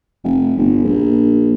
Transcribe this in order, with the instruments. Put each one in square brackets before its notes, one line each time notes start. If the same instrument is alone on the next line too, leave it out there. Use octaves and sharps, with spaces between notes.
[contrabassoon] F1
G1
A#1